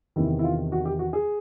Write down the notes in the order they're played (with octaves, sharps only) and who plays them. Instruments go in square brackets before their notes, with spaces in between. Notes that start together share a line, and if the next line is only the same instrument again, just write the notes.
[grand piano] E2 C3 D#3 E4
E4
F4
F#4
G4
F#4
G#4